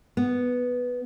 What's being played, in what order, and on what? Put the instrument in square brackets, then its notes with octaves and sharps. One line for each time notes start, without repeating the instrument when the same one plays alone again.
[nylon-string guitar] B3